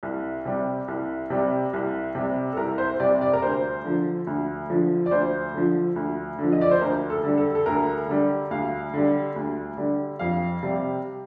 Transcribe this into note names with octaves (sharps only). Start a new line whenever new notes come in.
C2
C3 G3
C2
C3 G3
C2
C3 G3
A4
C2 A#4
C5
C3 G3 D5
D5
A#4
D2 C5
D3 F3
D2
D3 F3
D5
D2 C5
D3 F3
D2
D3 F3
D#5
D5
C5
D2 A#4
A4
D3 G3
A4
A4
D2 A#4
D3 G3
D2 F5
D3 G3
D2
D3 G3
F2 F5
C3 G3